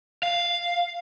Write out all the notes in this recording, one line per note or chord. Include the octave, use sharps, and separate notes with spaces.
F5